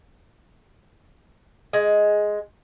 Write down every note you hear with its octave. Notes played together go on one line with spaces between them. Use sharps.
G#3